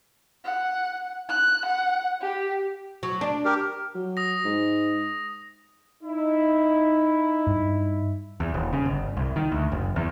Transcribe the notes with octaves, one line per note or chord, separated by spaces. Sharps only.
F#5
F#6
F#5
G4
F#3
D4
G4 A#4
F#3
D#6 A#6
G#2
D#4 E4
G2
E2
D#1
C#3
G1
C2
D#3
D2
F#1
E2